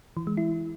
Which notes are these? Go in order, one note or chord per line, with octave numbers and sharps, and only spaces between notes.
E3
G#3
E4